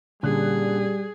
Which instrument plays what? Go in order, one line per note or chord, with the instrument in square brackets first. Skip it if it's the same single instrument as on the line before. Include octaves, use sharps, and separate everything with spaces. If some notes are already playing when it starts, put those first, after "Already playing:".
[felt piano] A#2 C#4 F#6 [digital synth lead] D3 [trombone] G3 [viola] G#4